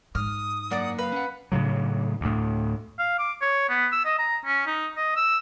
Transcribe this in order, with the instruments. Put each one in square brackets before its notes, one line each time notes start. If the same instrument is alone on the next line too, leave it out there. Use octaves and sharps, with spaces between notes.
[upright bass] G#2 [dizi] D#6 [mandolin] F6
[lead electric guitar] F#2 A#3 [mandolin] D5 F#5
[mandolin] B4 [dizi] F5
[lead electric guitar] C#4 F#5
[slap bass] A2 C#3 F#3
D2 A2
[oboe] F5
D6
C#5
B3
E6
D#5
A#5
C#4
D#4
D#5
E6